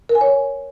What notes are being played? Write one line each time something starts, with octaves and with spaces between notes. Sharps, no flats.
A#4
G#5
C#5